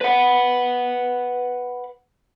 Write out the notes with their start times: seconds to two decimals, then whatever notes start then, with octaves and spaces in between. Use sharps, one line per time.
0.01 B4 F#5